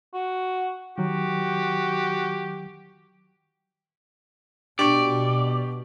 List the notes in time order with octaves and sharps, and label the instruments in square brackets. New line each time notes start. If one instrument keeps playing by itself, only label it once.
[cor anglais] F#4
[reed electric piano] D#3 F#3 [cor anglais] F#4 [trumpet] G4
[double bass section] B2 [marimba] D4 [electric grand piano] G4 C#6 D6 [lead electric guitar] D5